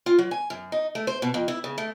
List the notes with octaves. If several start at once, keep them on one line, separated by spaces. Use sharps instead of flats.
F4
F#3
G#5
F#2
D#4
A3
C5
B2
F2
E4
C#3
A3